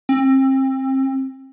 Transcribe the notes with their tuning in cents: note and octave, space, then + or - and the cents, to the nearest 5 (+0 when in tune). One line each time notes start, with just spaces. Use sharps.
C4 +30